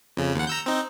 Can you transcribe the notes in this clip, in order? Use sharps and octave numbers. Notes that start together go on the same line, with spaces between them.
F2 C#3
D#2 F#5
A#5 E6 G6
C4 D#4